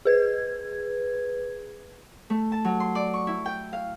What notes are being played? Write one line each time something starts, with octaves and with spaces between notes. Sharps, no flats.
G#4 B4 G#6
A3
A5
F#3
C6
D5
C#6
E4
G5
F5